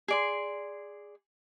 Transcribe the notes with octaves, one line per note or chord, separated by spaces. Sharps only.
G#4 D5 C6